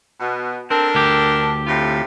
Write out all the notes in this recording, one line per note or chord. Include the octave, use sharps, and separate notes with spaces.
B2
C4 D4 A4 A#4
D2 G4
A2 C3 F4